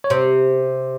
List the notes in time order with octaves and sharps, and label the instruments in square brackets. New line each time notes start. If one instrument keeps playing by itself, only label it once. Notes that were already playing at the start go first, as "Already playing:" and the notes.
[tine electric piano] C#5
[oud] C3 [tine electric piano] C5